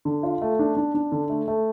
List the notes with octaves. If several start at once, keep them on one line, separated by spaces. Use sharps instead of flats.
D3
F4
A3
D4
D4
D4
D3
A3
A3